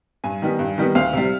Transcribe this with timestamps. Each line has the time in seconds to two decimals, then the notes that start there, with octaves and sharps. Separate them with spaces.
0.24 G2 G#5
0.42 D#3 G3 B3
0.59 G2
0.78 D#3 G3 B3
0.95 D2 F5
1.13 C3 G3